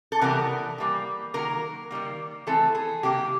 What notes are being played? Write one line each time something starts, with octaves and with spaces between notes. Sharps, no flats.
A4
C3 E3 G3 B3 A#4
E3 G3 A#3
D#3 F#3 A#3 A#4
D#3 G3 A#3
E3 A3 C4 A4
G#4
C3 D#3 F#3 A#3 G4